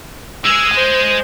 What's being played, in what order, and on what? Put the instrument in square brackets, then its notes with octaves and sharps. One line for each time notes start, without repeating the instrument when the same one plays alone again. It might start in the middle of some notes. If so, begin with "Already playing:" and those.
[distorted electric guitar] G#3 G#4 [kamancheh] E6
[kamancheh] C5